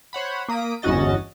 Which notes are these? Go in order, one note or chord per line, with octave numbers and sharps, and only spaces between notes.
C5 C#5 F#5 B5
A#3 D#6 B6 D7
G1 E2 C#4 F#4 D#5 A6